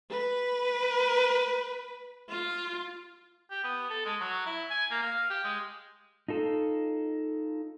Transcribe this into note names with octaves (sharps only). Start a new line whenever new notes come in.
B4
F4
G4
B3
A4
G#3
F#3
E4
G#5
A#3
F5
G4
G#3
D#4 F4 A4